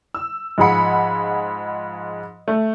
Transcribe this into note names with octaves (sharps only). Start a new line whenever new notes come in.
E6
G#2 F3 G#4 F#5 B5 C#7
A3